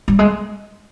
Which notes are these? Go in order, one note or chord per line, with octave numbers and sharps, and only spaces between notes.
G3
G#3